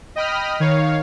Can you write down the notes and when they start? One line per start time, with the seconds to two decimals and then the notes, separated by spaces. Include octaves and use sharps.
0.16 D#5 G5 B5 D#6 F6
0.60 D#3 C#5 F5